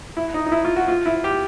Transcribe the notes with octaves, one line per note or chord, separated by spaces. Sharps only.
E4
D#4
D#4
E4
F4
F#4
F4
E4
G4